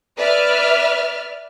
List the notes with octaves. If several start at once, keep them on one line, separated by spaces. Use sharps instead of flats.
B4 D5 E5 F6